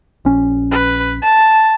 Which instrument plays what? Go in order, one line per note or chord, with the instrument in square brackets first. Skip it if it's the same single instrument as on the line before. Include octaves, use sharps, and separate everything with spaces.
[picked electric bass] A#1 C#4
[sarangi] B4
A5